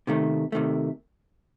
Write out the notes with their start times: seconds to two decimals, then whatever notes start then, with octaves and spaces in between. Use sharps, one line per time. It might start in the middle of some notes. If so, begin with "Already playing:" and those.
0.07 C3 D#3 A3
0.52 C3 D#3 A3